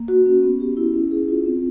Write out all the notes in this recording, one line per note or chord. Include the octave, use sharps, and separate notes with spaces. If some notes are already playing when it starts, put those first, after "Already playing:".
Already playing: A#3
F#4
C#4
B3
G4
E4
C#4
G#4
F4
C4